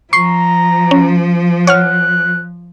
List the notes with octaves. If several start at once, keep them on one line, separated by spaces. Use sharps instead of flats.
F3 A#5 C#6 C7
C#4
C#5 F#5 F6 F#6